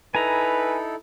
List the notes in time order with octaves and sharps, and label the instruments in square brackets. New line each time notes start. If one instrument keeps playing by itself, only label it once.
[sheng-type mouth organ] D#4 E4 A4 [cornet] B4 [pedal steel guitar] G#5 A#5